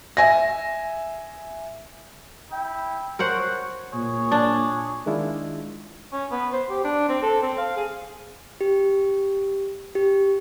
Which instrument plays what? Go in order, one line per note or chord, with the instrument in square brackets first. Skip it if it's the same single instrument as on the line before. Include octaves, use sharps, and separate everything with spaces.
[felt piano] E5 G#5 A#6
[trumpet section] E4 G5
[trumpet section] F#4 C#5 [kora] A#4 C5 F#5
[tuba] A#2 [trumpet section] G#4 C#5
[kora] D4
[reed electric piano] D#3 G#3 D4 E4 F4
[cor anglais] C#4
B3
C5
G4
D4
C4
A4
C4
F5
G#4
[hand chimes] G4
G4